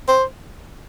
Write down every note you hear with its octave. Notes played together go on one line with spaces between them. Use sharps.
C5